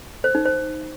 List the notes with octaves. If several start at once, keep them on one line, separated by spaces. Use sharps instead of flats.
C5
D#4
C5